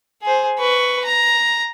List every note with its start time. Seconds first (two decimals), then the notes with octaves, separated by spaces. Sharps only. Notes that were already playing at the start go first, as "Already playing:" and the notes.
0.23 G#4 C5
0.58 B4 C#6
1.04 A#5